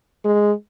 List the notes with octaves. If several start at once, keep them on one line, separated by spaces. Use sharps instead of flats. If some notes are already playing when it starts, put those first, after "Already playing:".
G#3